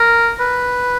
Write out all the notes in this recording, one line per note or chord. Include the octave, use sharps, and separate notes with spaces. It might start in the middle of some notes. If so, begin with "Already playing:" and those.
Already playing: A#4
B4